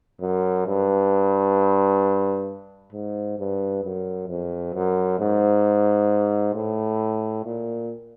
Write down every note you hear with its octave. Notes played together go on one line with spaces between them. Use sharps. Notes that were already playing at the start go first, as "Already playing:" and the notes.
F#2
G2
G#2
G2
F#2
F2
F#2
G#2
A2
A#2